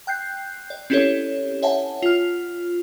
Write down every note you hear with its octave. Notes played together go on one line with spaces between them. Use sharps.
G5 F#6 G6 C7
D5
C4 C#4 E4 G4 A4 C#5
C#5 E5 F#5 G#5 A5
F4 F6